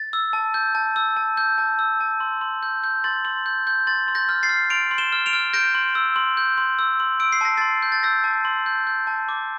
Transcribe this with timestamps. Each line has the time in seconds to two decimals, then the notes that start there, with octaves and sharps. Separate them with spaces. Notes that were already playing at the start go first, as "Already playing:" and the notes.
Already playing: A6
0.13 E6
0.33 A5
0.54 G6
0.75 A5
0.96 E6
1.17 A5
1.37 G6
1.58 A5
1.79 E6
2.01 A5
2.20 C6
2.41 C6
2.63 G6
2.84 G6
3.04 C6 A6
3.25 C6
3.46 G6
3.67 G6
3.87 C6 A6
4.08 C6
4.15 G6 A#6
4.29 F6
4.43 A6 C7
4.49 F6
4.70 C6 D7 F7
4.91 C6
4.98 E7 G7
5.13 F6
5.26 D7 F7
5.33 F6
5.53 G6 A#6 D7
5.75 C6
5.95 E6
6.16 C6
6.37 G6
6.58 C6
6.79 E6
7.00 C6
7.20 E6 D7
7.32 C7
7.41 A5 A#6
7.57 C6 A6 C7
7.83 G6
7.92 A6
8.03 E6 G6 A#6
8.24 A5
8.45 C6
8.66 G6
8.87 G6
9.07 A5
9.29 D6